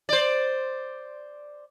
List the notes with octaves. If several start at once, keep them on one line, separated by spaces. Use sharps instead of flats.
C5 D5